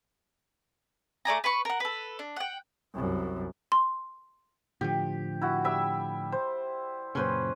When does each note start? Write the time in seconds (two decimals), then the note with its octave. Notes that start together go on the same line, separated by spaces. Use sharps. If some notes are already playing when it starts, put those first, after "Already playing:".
1.25 A3 D5 G#5 A#5
1.44 B4 B5 C#6
1.65 A#4 F#5
1.80 A4 B4
2.19 D4
2.36 F#5 G5
2.95 C2 F#2
3.72 C6
4.81 A2 D3 F3 G4
5.41 E4 F#4
5.64 G3 E5 E6
6.32 C5
7.15 F#2 A#2 C#3 C#4 B4 C5